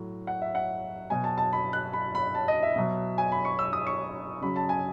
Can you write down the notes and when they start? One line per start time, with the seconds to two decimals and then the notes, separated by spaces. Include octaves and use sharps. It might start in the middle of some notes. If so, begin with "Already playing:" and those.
Already playing: A2 F#3
0.27 F#5
0.42 E5
0.55 F#5
1.10 B2 F#3 G#5
1.24 A5
1.38 A5
1.53 B5
1.73 F#6
1.93 B5
2.15 B5
2.35 A5
2.48 D#5
2.63 E5
2.76 B2 F#3
3.18 G#5
3.32 B5
3.45 C#6
3.59 E6
3.73 D#6
3.87 C#6
4.41 C#3 F#3 B5
4.56 A5
4.69 G#5